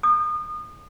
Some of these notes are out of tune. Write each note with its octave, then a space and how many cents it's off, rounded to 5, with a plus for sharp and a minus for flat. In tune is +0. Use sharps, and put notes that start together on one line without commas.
D#6 -30